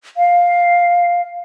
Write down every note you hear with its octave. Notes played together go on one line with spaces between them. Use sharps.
F5